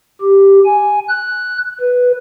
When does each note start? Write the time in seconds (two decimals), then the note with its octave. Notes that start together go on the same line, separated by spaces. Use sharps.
0.21 G4
0.65 G#5
1.09 F#6
1.80 B4